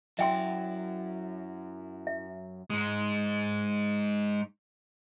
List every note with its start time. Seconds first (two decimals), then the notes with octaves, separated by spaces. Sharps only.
0.19 F#2 E4 F#4 D5 E5 G5 C6
2.07 E5
2.70 G#2 G#3